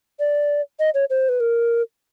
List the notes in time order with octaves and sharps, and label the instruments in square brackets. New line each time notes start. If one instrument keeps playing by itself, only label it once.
[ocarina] D5
D#5
C#5
C5
B4
A#4